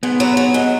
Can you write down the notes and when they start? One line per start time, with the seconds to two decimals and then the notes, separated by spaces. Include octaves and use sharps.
0.03 G#2 B3
0.20 F#3
0.37 F#3
0.54 G#2